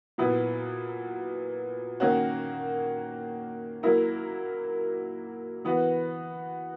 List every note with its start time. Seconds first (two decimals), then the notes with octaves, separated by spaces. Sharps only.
0.18 A#2 F#3 B3 E4
2.00 D#3 A#3 C#4 F#4
3.83 F#3 A#3 E4 A#4
5.65 E3 B3 F#4